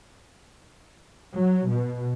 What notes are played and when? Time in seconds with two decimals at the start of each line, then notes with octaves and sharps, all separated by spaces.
1.35 F#3
1.70 B2